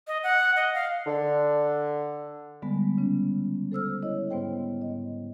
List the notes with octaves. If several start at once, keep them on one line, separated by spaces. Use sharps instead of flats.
D#5
F#5
D#5
F5
D3
D3 G3 G#3 B3
C#3 C#4
A4 C5 E6 F6
E4 C#5 D#5
G#2 B3 C5 G5
D#5